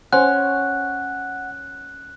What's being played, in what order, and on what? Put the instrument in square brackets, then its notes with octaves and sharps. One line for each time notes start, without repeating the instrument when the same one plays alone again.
[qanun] C#4 [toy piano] C5 G#5 C6 [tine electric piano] F#5 [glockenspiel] F#6